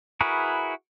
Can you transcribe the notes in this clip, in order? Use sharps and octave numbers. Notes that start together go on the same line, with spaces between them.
E4 F#4 G#4 A#4 B4